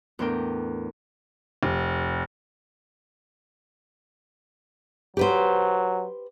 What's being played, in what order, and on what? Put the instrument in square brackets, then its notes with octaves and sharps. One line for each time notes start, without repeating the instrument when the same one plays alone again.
[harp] E2 A2 D4 A#4 G5
[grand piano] F1
[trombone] F#3 [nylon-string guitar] G4 B4 C5